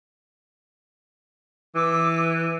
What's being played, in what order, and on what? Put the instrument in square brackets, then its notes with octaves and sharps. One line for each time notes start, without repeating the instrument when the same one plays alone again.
[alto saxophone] E3 [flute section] D6 E6